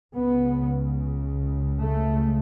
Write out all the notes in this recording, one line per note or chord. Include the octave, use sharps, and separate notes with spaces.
C#2 C#3 B3
A3